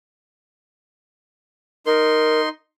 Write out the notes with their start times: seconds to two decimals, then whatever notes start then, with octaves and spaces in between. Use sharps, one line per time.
1.86 D#4 A#4 C6